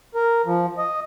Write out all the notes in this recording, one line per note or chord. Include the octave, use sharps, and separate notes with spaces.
A#4
F3
D#5